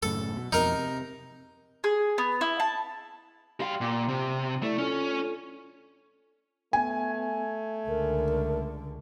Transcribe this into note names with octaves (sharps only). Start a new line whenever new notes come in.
F#2 A2 C#3 A4
B2
F2 B2 D#4 A#4
C3
G#4
B3
E4
A5
G3 F5 G5 C6
A#2
C3
A3 E4 D5 C#6
C#4 F4 A4
A3 B3 G#5
C#2 D3 A#4